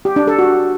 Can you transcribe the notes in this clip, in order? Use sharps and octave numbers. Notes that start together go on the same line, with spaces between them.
G4
D4
A4
F#4